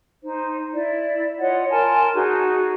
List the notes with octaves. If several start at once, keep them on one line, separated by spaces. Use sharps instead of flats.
D#4 C5
E4 D5
F4 C#5 D#5 F#5
A#4 G#5 A5 C6
D#4 F#4 G#4